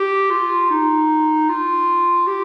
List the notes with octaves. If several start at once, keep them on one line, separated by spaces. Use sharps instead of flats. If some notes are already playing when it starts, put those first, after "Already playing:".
Already playing: G4
F4
D#4
F4
G4